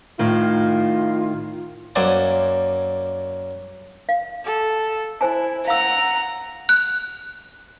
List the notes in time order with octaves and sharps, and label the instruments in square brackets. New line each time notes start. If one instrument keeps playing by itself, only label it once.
[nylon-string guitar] A2 D#3 [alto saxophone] F4
[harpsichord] F#2 A#3 C5 D5 G#5 A5
[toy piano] F5
[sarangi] A4
[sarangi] E4 [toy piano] C5 G#5 A5
[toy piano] F5 E6 [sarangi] F#5 [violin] A#5
[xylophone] F#6